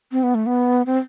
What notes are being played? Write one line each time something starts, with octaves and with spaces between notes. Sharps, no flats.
C4
B3
A3
B3
C4